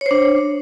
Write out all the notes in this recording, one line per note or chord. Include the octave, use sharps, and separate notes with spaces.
D4 C5 C#5